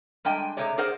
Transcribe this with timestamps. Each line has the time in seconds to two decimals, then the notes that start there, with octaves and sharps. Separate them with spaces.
0.25 G3 G#3 D4 G5 G#5
0.57 C3 G#3 A3 C#5 D5
0.78 G#4 A#4 C5 D5 F#5